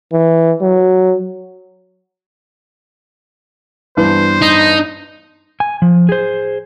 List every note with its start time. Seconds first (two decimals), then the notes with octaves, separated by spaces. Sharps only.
0.12 E3
0.62 F#3
3.97 G2 E3 B3 C5
4.42 D#4
5.60 G#5
5.82 F3
6.09 G#4 C5